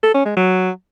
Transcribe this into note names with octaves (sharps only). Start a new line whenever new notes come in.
A4
C#4
G#3
F#3